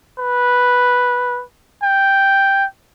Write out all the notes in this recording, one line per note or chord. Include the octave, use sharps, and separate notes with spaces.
B4
G5